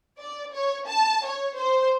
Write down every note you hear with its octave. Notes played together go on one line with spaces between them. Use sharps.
D5
C#5
A5
C#5
C5